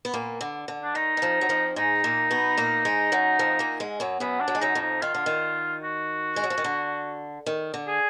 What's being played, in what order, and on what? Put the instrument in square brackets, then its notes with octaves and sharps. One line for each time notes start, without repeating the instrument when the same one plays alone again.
[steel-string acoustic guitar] B3
A#2 A#3
D3
D3
[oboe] D4
[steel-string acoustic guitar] D#3 [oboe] D#4
[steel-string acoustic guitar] D#3
F2 F3
F#3
F2 F3
[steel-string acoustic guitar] G#2 G#3 [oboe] D#4
[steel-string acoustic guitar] A#2 A#3
B2 B3
A#2 A#3
G#2 G#3
F#2 F#3
F2 F3
A#2 A#3
G#2 G#3
F#2 F#3
[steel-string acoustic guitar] F#2 F#3 [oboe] B3
[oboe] D4
[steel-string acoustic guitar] F#3
G#3
[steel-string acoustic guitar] F#2 F#3 [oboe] D#4
[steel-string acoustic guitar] F2 F3
[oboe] D#4
[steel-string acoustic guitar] D#3 [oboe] F4
[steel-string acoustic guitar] D3
D#3
[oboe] F#4
[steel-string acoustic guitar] G#3
F#3
F3
D#3
D3
D#3
D3
[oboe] G#4